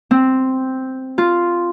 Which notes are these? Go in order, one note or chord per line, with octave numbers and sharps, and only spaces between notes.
C4
F4